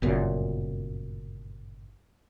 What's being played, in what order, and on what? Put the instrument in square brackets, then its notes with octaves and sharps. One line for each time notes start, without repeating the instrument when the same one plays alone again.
[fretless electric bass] G1 F#2 A#2 C#3